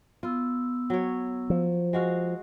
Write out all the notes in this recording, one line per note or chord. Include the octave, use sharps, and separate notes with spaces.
B3 F4 E6
F#3 C#5
F3
G#3 F#4 F5